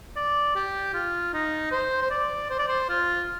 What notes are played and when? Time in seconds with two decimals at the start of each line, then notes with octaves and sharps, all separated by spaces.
0.16 D5
0.56 G4
0.94 F4
1.33 D#4
1.71 C5
2.02 C5
2.10 D5
2.50 C5
2.59 D5
2.68 C5
2.89 F4